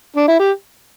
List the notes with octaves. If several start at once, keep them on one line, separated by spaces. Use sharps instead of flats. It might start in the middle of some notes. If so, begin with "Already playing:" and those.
D4
E4
G4